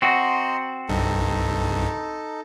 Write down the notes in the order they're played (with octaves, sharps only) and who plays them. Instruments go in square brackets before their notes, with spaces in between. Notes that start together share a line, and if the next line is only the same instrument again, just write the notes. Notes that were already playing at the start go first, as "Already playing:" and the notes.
[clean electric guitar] C4 F#4 [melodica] D#5 A#5 C6
[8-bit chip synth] C2 G2 [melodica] D#4 A4